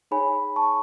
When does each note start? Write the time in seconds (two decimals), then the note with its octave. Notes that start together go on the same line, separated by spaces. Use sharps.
0.11 D#4 G#4 C#5 G#5 B5
0.56 A5 C#6